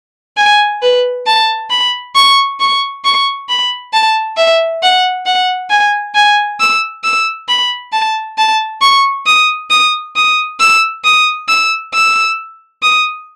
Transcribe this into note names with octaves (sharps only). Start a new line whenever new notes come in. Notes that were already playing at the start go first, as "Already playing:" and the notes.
G#5
B4
A5
B5
C#6
C#6
C#6
B5
A5
E5
F#5
F#5
G#5
G#5
E6
E6
B5
A5
A5
C#6
D#6
D#6
D#6
E6
D#6
E6
E6
D#6